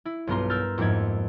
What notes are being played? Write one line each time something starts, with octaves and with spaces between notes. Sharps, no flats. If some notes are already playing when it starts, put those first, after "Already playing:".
E4
B1 G2 B3 F4 A#5 C6
A#4 E6 F6 G6 A6
F2 G#2 A#3 E4 G#6